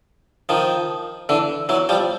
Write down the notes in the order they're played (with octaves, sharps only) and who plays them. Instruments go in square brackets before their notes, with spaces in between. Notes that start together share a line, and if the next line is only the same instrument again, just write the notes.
[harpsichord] D#3 F3
D3 E3
E3 F#3
F3 G3